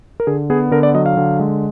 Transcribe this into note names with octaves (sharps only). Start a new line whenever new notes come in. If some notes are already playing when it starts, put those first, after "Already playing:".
A#4
D3 G#4
B3 G#4
D3 A#4
D5
F#3 D#5
F5
D3
G#3